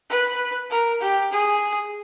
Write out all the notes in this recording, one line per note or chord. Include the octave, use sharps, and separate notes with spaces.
B4
A#4
G4
G#4